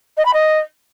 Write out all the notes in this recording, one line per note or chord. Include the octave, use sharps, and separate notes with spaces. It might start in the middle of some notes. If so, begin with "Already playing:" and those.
D#5
B5
D#5